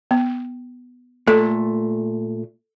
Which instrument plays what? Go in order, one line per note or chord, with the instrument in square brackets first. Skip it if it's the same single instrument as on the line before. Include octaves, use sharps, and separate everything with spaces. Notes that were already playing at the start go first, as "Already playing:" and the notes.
[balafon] B3
[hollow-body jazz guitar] A#2 A3 [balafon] A4